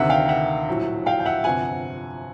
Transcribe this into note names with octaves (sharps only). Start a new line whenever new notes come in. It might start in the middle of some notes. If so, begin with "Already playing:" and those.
Already playing: D2 C3 D#3 E5 F#5
F5 G5
E5 F#5
A#1 A2 F#3
F5 G5
G5
E5 F#5
G1 F2 C3 F#5 G#5